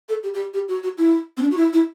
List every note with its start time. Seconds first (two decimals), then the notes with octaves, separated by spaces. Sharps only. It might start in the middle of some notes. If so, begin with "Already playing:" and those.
0.09 A4
0.23 G4
0.34 G4
0.54 G4
0.68 F#4
0.83 F#4
0.98 E4
1.37 C4
1.42 D4
1.51 F#4
1.57 E4
1.73 E4